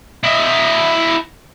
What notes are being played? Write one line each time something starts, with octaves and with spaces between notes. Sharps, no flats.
E4 D#5